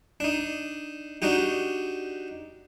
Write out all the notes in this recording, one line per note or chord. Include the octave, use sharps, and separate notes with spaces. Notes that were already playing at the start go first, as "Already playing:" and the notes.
D4 D#4
D4 D#4 F#4 G4